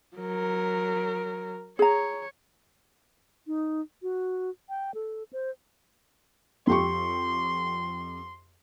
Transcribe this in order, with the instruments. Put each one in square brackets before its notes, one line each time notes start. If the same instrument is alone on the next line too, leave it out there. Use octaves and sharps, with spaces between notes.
[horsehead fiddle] F#3 A#4
[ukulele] G#4 A#5 [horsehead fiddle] C#5
[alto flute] D#4
F#4
G5
A4
C5
[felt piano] F2 G4 C#6 [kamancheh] C6